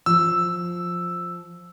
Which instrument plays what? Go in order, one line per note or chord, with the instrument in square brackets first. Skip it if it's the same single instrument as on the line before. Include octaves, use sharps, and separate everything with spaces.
[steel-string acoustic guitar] F3 [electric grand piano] E6